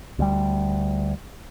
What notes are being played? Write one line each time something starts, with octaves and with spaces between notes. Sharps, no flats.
D2 G3